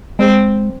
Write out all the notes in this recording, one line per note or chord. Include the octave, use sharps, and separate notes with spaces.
G#3 C4